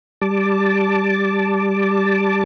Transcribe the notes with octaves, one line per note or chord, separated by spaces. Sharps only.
G3 A5 D6